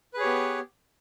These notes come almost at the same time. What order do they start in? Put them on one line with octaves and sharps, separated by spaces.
B4 G#4 C#5 G4 B3